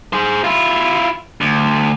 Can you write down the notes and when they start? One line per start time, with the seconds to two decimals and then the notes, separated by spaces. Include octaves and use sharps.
0.13 G#4 C5
0.44 E4 F4
1.41 D2